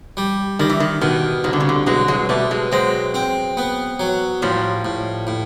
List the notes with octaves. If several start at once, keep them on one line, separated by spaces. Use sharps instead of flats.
G3
D#3 G3
E3
D#3
B2 D#3
C2 D#3
D3
C#3
D3
B2 F#3 G#3
F#3 G#3
B2 G3 A3
F#3 G#3
F#3 G#3 C4
C4
B3
F#3
A2 F3 G3
A2
A2